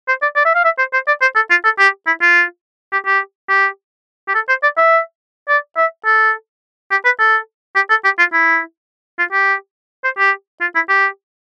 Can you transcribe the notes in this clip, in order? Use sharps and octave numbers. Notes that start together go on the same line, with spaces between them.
C5
D5
D5
E5
F5
E5
C5
C5
D5
C5
A4
F4
A4
G4
E4
F4
G4
G4
G4
G4
A4
C5
D5
E5
D5
E5
A4
G4
B4
A4
G4
A4
G4
F4
E4
F4
G4
C5
G4
F4
E4
G4